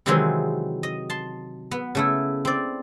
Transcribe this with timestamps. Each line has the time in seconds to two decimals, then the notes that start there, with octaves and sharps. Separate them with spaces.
0.06 C3 D#3 E3 F#3 G#3 C4
0.83 D#5
1.10 A5 C6
1.71 B3
1.95 C#3 A3 E4
2.45 C4 D5